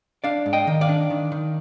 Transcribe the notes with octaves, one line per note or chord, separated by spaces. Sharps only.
D4 D5 F5
G#2
D#5 G5
D#3
D5 F5
D4
D#3
D#3